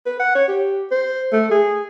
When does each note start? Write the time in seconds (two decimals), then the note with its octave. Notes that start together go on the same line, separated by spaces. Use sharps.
0.06 B4
0.20 F#5
0.35 C#5
0.48 G4
0.92 C5
1.33 A3
1.51 G#4